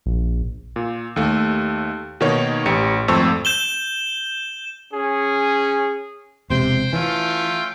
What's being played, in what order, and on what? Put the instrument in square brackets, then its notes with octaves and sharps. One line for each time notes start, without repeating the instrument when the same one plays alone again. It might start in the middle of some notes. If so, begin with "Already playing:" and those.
[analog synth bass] A#1
[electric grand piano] A#2
D#2 A3
B2 D#3 A#3 D#4 C#5
A1 G4 C#7
G#1 F2 A3 C5 C#6 E6
[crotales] G6 E7 G7
[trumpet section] C#4 G#4
[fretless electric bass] E1 C3 [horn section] C5 [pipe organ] G5
[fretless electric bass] E3 [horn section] A3 C#4 F4